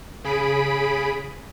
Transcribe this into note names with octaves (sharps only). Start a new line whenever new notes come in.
C#3 G#4 B5 B6 D7 D#7